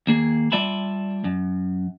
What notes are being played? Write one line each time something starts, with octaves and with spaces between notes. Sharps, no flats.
D#2 A#3 G#4
G3 F4 D5 E5 A5 B5
F#2